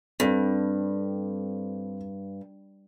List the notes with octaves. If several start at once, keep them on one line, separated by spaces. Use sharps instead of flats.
G2 C4 A4